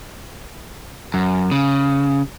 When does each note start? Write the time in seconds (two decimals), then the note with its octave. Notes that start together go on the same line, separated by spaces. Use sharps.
1.14 F#2
1.51 C#3